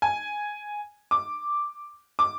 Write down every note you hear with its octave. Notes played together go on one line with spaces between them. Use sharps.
G#5
D6
D6